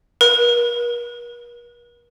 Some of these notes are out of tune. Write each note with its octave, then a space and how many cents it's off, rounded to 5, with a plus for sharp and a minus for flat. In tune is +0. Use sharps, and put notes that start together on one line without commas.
A#4 +45